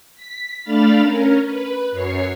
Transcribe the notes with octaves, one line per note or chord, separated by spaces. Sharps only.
B6
A3 D4 F5 B5 F6 A6
C#4 A#4
B4
F#2 C#5 C7